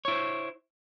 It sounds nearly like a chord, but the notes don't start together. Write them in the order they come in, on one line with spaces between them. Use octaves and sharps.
C#5 E4 C5